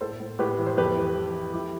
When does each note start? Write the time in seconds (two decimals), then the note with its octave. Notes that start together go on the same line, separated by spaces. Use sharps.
0.01 A2 A4 C5
0.20 A2
0.39 A2 G4 B4
0.59 E3
0.66 C5
0.77 F2 G4 B4
0.97 E3
1.16 E3
1.34 E3
1.53 F3 E4 G4